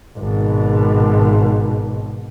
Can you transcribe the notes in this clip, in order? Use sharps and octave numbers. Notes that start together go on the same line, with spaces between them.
G#1 B2